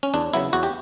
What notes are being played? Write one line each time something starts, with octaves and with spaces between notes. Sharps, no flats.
C#4
E2 D4
C#3 F#3 B3 E4
E2 F#4
G4